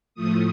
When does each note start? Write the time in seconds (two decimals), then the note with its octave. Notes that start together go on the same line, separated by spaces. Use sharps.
0.14 A2 F3 A3 D#6